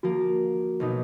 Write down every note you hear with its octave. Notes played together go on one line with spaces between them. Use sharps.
F3 A#3 F#4
B1 B2 D#4